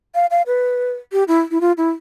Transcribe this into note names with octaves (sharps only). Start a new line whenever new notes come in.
F5
F5
B4
G4
E4
E4
F4
E4